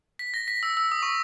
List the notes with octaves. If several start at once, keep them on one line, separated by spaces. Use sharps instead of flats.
B6
A#6
B6
E6
E6
D#6
C#6